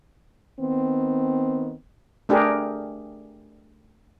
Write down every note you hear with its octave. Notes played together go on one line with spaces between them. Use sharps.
D#3 B3 C4
A3 D4 G4 G#4 A#4